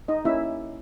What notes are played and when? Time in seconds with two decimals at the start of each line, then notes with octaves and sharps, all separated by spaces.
0.08 D#4 D#5
0.24 A#3 C#4 E4 G4 E5